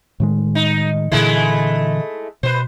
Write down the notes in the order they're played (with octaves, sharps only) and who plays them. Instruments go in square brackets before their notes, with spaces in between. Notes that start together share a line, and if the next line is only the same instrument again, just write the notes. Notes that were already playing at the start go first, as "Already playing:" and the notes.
[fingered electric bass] A2 D#3 G#3
[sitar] D#4
[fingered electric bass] A#2 D3 E3 [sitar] G#3 A3 E4
[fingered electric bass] B2 [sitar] B4 C5